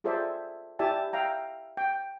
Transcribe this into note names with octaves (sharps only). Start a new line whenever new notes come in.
F4 G#4 A4 C5 D5 E5
E4 G4 D5 E5 G#5 A5
E5 F5 G5 A#5
G5